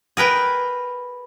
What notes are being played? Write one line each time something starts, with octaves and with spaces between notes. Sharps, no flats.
G#4 A#4 B4 G5